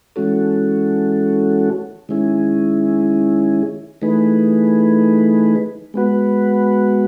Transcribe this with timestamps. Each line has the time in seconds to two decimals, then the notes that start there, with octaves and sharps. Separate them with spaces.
0.16 E3 G#3 C#4 F#4 A4
2.09 D#3 G#3 C#4 E4 G#4
4.02 E3 A3 D#4 G#4 B4
5.94 G#3 B3 F#4 B4